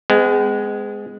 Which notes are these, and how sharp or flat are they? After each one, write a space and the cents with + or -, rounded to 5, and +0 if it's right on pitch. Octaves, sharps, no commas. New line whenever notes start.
G#3 +0 B3 +45